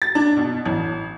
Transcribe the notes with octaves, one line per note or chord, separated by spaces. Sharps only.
A6
D4
B2
A1